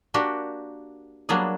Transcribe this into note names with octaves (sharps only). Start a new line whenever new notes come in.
A#3 D4 F#4 G4
F#3 G3 A#3 B3 D4 G#4